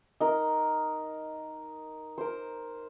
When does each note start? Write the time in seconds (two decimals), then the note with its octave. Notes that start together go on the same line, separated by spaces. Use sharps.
0.20 D#4 A#4
2.18 A#4 C5